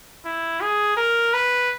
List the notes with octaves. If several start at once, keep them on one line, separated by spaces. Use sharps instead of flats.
E4
G#4
A#4
B4